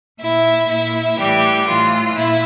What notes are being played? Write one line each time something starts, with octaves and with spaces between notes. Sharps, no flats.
A#2 E4 E5
A#2 E4 E5
A2 E3 G3 G4
A2 E3 F4
A#2 E4